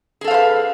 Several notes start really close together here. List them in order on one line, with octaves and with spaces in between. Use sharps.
G#4 A4 F5 C5 B4